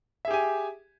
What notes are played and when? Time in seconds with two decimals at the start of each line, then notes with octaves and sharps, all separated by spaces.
0.25 E5
0.28 G#4
0.31 G4
0.34 G#5